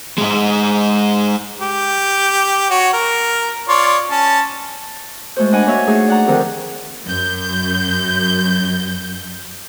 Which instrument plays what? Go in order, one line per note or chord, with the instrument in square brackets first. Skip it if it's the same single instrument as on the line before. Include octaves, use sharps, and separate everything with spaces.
[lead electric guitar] G#2 G#3
[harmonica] G4
F#4 C#5
A#4
F4 C#5 D5
C#4 A5
[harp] G#3 A3 F#4 C5
D4 D#5 F#5 G#5 B5
A#3 F#4 C#5 E5 E6
A3 D#4 G#4
D5 F#5 A#5
D3 D#3 F3 C4 G4 A#4
[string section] F#2 G6